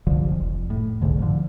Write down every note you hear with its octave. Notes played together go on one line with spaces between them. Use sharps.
G1 C2 D3 F3
F1
A2
F1 C2 G#2 D3
D3 D#3 F3